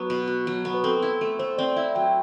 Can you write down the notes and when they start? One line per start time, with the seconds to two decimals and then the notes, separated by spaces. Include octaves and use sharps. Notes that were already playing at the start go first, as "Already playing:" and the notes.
Already playing: F#3 B3 B4
0.10 B2
0.27 F#4
0.47 F#3
0.65 B3
0.74 B4
0.84 C4 A4
1.02 E4
1.21 A3
1.39 A3 C5
1.58 C4 D5
1.76 E4 E5
1.95 F#3 G5